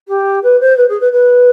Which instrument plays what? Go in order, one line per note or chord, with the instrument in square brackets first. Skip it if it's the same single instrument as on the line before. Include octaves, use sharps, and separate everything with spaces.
[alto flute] G4
B4
C5
B4
G#4
B4
B4